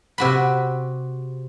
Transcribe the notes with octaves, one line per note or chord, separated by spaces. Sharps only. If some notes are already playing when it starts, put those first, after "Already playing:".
C3 F#4 B5